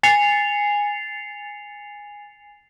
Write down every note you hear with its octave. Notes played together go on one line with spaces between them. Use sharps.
G#5 A6 C7 C#7 F7